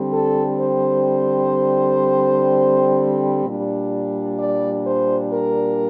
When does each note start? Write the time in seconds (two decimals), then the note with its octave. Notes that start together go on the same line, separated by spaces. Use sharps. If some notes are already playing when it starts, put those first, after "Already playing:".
Already playing: D3 G3 C4
0.13 A4
0.61 C5
3.44 A#2 G3 D4
4.39 D5
4.86 C5
5.33 A#4